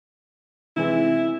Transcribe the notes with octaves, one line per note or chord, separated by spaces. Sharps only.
C3 E3 G#3 E4